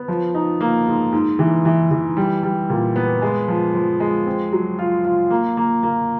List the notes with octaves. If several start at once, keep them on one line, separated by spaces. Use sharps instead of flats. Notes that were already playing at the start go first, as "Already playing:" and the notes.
Already playing: B3
F3
D#4
A#3
G#2
G#2
E3
E3
E3
G3
G3
A#2
B3
G#3
F3
F3
G#3
C4
F#3
F4
F4
A#3
A#3
A#3